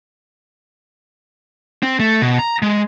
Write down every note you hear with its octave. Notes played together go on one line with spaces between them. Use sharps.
C4
A3
B2
A#5
G#3